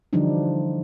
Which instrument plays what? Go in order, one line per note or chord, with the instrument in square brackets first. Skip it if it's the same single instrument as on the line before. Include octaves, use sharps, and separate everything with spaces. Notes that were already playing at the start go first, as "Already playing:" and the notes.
[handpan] D3 E3 F3 G3 D4 D#4